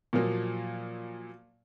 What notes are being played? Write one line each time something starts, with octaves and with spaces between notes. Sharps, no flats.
A#2 F3 F#3 A#3